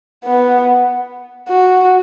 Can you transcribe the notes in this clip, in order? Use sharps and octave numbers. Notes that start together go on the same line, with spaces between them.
B3
F#4